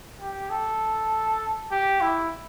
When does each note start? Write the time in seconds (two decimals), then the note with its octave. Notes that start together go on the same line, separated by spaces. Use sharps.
0.20 G4
0.50 A4
1.71 G4
2.01 E4